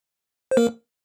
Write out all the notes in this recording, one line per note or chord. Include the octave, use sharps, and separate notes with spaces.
C5
A#3 A#4